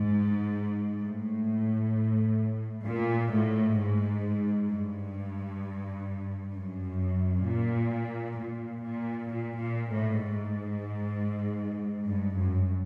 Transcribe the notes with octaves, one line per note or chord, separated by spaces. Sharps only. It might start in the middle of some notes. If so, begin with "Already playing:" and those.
Already playing: G#2
A2
A#2
A2
G#2
G2
F#2
A#2
A#2
A#2
A#2
A#2
A2
G#2
G2
F#2